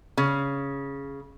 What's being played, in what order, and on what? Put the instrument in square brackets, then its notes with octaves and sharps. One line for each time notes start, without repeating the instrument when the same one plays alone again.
[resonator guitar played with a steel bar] C#3